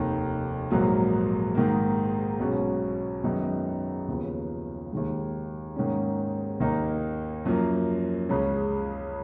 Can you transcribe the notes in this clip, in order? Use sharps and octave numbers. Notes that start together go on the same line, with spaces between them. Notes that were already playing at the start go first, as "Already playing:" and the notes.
Already playing: F1 D#2 D#3
A#1 G#2 F#3 A#3
G#2 D#3 A#3
B1 B2 G#3 C#4
F#2 D#3 G#3 B3 D#4
D#2 C#3 F3 B3
D#2 D#3 G#3
G#2 D#3 A#3 C#4
D#2 D#3 A#3 D#4
F#2 F3 A#3
C#2 C#3 G#3 C#4